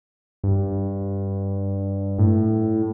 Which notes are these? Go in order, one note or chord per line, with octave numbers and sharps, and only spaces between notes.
G2
A2